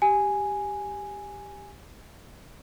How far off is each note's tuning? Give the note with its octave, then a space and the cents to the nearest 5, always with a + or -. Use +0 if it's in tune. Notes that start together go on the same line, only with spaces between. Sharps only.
G4 +0 G#5 +0